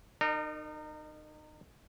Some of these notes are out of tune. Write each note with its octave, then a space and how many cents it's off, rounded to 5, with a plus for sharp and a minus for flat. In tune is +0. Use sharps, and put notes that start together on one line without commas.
D#4 -30 A#4 -25 D5 +40